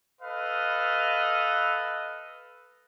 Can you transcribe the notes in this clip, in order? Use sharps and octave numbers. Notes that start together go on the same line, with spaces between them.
A4 B4 D#5 F5